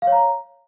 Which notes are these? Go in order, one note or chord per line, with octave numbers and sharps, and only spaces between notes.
F5
C#5
A#5